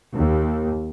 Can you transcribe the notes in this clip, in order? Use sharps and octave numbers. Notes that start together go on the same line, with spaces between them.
D#2